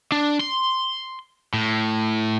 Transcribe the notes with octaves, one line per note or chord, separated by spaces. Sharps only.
D4
C6
A2